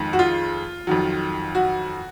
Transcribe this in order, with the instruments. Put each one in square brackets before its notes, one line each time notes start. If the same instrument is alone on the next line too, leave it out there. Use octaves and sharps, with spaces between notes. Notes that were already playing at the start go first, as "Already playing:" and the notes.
Already playing: [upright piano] F2 D#3 G#3
F#4
F4
F2 D#3 F#3
F#4